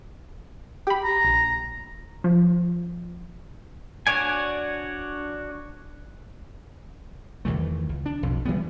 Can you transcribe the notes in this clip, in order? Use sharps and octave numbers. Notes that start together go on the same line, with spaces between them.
G4 B5
A#5
A#1
F3
D4 F#4 C#5 D5 G#5
E2 D#3 E3 A3
C#2
D4
B1 F2
E3 G3 G#3 B3